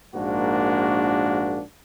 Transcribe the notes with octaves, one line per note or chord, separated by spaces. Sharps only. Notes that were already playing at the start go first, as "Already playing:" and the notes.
A#1 G#2 A#3 D4 F#4